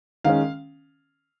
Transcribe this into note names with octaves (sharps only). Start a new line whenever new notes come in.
D#3 G#3 C#4 F5